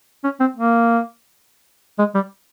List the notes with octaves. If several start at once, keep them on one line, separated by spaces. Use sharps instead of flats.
C#4
C4
A#3
G#3
G3